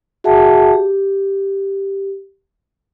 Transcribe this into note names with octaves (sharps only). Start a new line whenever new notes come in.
F#4 G#4 E5 F#5 A5
G4